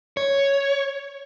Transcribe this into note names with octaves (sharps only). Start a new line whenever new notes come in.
C#5